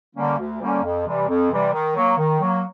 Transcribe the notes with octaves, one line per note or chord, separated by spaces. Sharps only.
D3 G3 A#3 C#4
D2
D3 G3 A#3 C#4
F2
C3 E3 G3
F2
C3 E3 G3
D#3
F#3 A#3
D#3
F#3 A#3